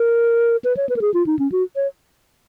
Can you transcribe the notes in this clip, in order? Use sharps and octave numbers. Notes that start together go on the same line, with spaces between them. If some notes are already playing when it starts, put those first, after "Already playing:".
Already playing: A#4
B4
C#5
B4
A#4
G#4
F4
D#4
C#4
F#4
C#5